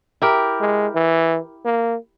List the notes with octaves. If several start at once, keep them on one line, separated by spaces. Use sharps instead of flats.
E4 G4 A#4
G#3
E3
A#3